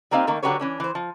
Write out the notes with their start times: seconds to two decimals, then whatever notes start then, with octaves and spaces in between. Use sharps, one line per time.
0.11 G3 A#3 C4 D#4 F5
0.27 D#3 A3 A#3 D#4
0.43 D3 F#3 F#4 G4 B4 C#5
0.60 E3 C#4 D4
0.80 E3 C5
0.95 F3